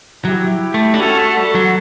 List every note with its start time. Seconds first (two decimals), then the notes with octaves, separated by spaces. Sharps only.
0.25 F#3 E4 G4
0.74 A3
0.94 D4
0.99 C#4 F#4 A4
1.18 A3
1.36 G3 F#4 A4
1.55 F#3